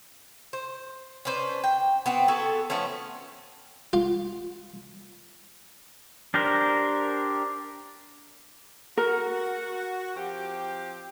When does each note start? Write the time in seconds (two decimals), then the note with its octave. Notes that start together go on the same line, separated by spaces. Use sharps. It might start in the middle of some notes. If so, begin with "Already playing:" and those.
0.53 C5
1.25 C#4 D4 B4 C5
1.64 G5
2.06 B3 C4 F#4
2.28 B3 F#4 G#4 A4
2.70 F3 A3 B3 C#4
3.93 F4
6.34 D4 G4 A#4 C5
8.98 F#4 A#4
10.16 F3 C4 G4